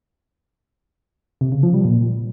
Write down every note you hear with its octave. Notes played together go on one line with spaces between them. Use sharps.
C3
C#3
F3
G3
A#2